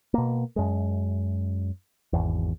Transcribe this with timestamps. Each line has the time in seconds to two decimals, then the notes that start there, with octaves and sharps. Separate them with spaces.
0.14 B2 A#3
0.56 F#2 G#3
2.13 G#1 E2